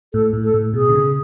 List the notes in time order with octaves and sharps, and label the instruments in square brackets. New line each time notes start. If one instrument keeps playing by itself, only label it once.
[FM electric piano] A2 [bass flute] A4
[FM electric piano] A2
[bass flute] A4
[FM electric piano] A2
[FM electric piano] B2 [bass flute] G#4
[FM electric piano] D3
C#3